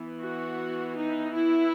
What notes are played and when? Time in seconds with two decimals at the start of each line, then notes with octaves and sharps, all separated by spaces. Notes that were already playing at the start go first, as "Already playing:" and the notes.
Already playing: E3 B3
0.21 F#4
0.97 D#4
1.33 E4